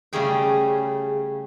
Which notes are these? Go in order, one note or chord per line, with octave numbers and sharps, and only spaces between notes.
C#3 G3 A3 C#4 G#4 G5